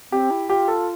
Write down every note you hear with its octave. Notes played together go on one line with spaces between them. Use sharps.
C4 G4
E4
F4 G4
A4